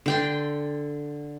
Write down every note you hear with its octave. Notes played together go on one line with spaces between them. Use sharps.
D3 G5 C6